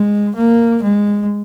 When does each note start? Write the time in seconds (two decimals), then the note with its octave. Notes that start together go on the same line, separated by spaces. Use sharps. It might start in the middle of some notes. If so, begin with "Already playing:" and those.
Already playing: G#3
0.35 A#3
0.83 G#3